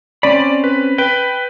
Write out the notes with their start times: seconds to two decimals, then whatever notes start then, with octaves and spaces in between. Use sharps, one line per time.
0.23 C4 C#4 D5 B5
0.64 B4
0.98 B4 G5